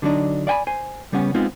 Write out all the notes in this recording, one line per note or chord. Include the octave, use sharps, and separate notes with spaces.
D3 F#3 G3 D4 D#4
D5 F5 G5 G#5 B5
C5 G#5
C#3 G3 B3 C#4 F#5
G#3 B3 C4 D#4 F4